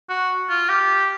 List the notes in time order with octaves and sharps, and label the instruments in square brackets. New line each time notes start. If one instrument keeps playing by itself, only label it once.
[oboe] F#4
F4
G4